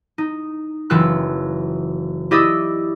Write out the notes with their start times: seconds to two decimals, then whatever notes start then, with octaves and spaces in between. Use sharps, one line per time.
0.18 D#4
0.90 F#1 E3 F4 G5 E6 F#6
2.31 E4 G4 D5 D#5 D#6 E6